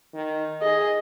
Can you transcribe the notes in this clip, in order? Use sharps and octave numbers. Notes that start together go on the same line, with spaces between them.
D#3
G#4 D#5